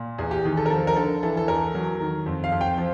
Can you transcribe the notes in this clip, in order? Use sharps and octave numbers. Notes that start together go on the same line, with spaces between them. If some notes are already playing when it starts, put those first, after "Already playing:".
Already playing: A#2
E2 G#4
G4
D#3 G#4
A4
A#4
F3 A4
A#4
D3 A4
E3 A4
A4
E2 A#4
F#3
D#3
F2
F5
F2
G5
F3